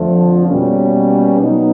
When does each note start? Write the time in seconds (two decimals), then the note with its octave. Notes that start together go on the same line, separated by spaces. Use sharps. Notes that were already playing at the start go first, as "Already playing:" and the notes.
Already playing: F2 D3 F3 A3
0.47 B2 G3 A#3 C#4
1.40 B2 F#3 B3 D#4